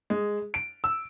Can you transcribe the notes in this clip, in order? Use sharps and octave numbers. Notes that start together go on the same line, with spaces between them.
G#3
D7
E6